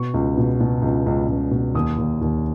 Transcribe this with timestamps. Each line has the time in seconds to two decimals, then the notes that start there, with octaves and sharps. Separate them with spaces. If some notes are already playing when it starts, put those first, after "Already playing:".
Already playing: B2 C#6
0.14 C#2
0.38 B2
0.60 B2
0.82 C#2
1.06 C#2
1.28 C#2
1.51 B2
1.74 D#2 D#6
1.98 D#2
2.21 D#2